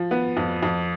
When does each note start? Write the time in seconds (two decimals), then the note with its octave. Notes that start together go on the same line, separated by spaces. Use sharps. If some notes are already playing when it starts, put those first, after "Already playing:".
Already playing: F3
0.11 B3
0.37 F2
0.63 F2